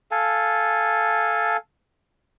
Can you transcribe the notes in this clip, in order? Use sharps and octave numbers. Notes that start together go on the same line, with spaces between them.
A4 F5 G#5 A5